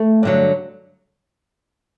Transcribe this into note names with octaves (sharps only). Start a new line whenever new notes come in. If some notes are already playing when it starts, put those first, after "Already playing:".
Already playing: A3
G2 D3 F#3